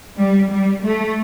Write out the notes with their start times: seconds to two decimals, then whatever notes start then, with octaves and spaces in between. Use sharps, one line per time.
0.18 G3
0.52 G3
0.84 A3